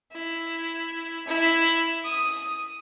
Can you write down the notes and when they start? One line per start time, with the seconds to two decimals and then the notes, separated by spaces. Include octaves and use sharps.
0.12 E4
1.27 E4
2.05 D#6